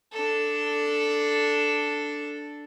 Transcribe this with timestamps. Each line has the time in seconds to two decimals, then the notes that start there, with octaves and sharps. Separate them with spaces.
0.13 D4 A4